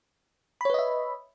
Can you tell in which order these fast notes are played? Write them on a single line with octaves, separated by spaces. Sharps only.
B5 C#5 B4 D#5 E5